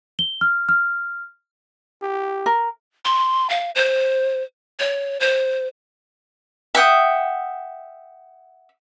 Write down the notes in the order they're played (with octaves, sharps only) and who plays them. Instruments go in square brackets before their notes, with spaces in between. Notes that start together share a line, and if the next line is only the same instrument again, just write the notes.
[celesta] G7
F6
F6
[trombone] G4
[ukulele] A#4
[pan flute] C6
F5
C5
C#5
C5
[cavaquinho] E5 F#5 G5 D#6